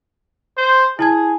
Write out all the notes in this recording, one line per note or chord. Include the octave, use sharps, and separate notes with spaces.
C5
E4 G#4 A5 G#6